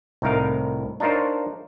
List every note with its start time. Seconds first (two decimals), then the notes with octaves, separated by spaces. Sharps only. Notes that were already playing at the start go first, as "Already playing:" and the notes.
0.22 C2 A2 D#4 A#4 F5
1.00 D4 D#4 F4 A#4 C5 C#5